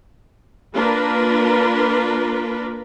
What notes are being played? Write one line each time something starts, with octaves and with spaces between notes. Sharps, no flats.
A#3 D4 F4 A#4 B4